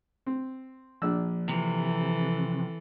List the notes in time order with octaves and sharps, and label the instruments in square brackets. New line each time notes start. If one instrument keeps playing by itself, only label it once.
[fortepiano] C4
[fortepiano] A#1 D4 E6 [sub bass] F3
[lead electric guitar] C3 [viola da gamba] E3 A4 [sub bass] F3